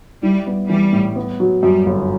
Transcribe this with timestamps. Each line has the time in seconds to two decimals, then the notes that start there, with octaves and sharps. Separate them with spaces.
0.22 G3 E4
0.47 B3
0.69 E3 G3
0.93 A2
1.16 B3
1.40 F#3
1.63 F#2 G3
1.86 G1